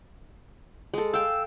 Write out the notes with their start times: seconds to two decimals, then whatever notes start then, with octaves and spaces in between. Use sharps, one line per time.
0.94 G#3 A4
1.13 F5 G5 E6